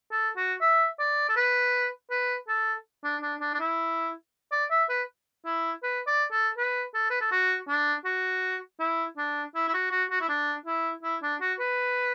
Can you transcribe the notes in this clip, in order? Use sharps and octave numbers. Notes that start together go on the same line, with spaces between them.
A4
F#4
E5
D5
A4
B4
B4
A4
D4
D4
D4
D4
E4
D5
E5
B4
E4
B4
D5
A4
B4
A4
B4
A4
F#4
D4
F#4
E4
D4
E4
E4
F#4
F#4
F#4
E4
D4
E4
E4
D4
F#4
B4